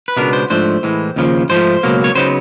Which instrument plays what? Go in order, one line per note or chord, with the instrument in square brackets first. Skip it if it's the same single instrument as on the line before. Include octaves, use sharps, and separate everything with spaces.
[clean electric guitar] B4
C#2 B2 G#3 B3 D4 A#4
C5
G#2 F3 A3 D4 C5
A2 E3 G#3
D#2 C#3 F3
G#2 F3 A3 C5
C#2 B2 F#3 A#3
C#5
C#3 F#3 B3 D#4 C5